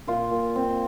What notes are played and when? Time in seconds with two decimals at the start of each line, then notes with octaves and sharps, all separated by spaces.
0.07 A#2 F4
0.31 A#2
0.56 C4